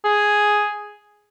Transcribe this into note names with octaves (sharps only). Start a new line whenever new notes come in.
G#4